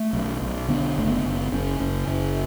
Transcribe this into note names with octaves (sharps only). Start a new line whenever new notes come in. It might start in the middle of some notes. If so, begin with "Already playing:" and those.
Already playing: A3
B1
B1
D3 B3
F#1 A3
B3
F#1
F#1 C#4
F#1
F#1